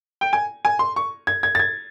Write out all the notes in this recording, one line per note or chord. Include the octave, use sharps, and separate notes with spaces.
G5
G#5
G#5
C6
C#6
G#6
G#6
A6
G#6